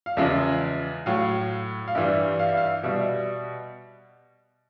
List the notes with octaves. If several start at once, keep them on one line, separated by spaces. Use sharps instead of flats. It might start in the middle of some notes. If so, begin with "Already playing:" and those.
F5
E2 C#3 F3 G#3 E5
A2 F#3 F5
F5
G2 E3 G3 E5
F5
E5
F5
B2 G3 E5